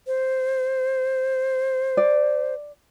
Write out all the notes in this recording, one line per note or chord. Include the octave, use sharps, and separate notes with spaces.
C5
D5